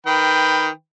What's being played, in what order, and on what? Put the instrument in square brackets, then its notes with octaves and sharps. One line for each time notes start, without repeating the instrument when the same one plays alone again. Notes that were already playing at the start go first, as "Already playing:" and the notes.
[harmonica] D#3 B4 G5